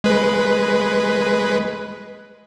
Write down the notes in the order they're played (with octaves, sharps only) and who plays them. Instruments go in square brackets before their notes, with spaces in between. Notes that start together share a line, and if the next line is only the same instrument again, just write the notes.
[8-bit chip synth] G#3 B4